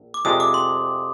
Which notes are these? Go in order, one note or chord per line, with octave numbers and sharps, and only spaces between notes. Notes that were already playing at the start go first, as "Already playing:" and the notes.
Already playing: A#1
D6
F2 C3 F3 G#3 D4 D#6
D6
C6